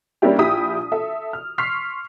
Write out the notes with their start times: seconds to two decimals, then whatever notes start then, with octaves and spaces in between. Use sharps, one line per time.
0.22 G3 A#3 C#4 D4 E4 G4
0.38 A#1 E4 G4 D#6 B6
0.92 A4 E5
1.33 F6
1.58 C6 C#6 F6 B6 C7